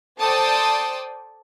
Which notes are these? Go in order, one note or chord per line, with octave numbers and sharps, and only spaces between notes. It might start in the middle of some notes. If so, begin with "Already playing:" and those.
A4 C5 D5 G5 A5 D#6